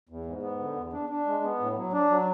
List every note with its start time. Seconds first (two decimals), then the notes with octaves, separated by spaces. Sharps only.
0.09 E2
0.26 G#2
0.43 B3
0.59 D3
0.76 E2
0.93 D4
1.10 D4
1.26 G#3
1.43 B3
1.60 A2
1.76 F#3
1.93 D4
2.10 F#3